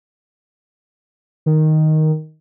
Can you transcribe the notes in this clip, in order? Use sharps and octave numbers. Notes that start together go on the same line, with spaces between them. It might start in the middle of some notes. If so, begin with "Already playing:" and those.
D#3